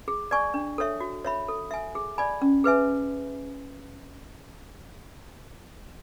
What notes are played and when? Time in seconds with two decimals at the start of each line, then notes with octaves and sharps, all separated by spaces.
0.08 G#4
0.31 D5 G#5 C#6
0.54 D4
0.78 A4 C#5 E5
1.01 F#4
1.25 C#5 E5 B5
1.48 A4
1.71 E5 G#5
1.95 G#4
2.18 D5 G#5 B5
2.42 C#4
2.64 G#4 B4 E5 G#5